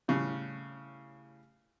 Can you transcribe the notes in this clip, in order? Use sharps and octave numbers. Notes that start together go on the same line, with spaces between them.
A2 C#3 G3